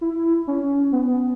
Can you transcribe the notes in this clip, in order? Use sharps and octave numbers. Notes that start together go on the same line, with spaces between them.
E4
C#4
B3